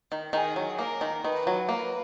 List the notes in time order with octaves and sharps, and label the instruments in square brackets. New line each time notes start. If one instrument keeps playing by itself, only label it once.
[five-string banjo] D#3
[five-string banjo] D#3 [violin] G#4
[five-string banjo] F#3
[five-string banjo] A#3 [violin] A#4
[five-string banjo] D#3
[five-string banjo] D#3 [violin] B4
[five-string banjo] F#3
[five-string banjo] A#3 [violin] B4